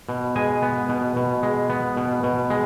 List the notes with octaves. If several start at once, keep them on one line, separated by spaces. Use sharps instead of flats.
B2
G#3 G#5
B3
B2
B2
G#3
B3
B2
B2
G#3